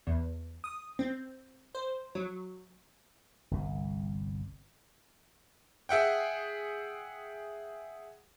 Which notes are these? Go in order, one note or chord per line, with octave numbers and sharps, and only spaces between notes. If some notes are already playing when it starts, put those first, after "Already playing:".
E2
D#6
C4
C5
F#3
G1 C2
G#4 E5 F#5 G5